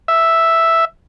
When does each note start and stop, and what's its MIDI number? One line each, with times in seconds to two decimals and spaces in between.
0.08 0.85 76